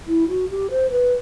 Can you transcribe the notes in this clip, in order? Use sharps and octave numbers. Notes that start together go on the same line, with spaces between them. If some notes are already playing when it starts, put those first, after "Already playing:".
E4
F#4
G4
C5
B4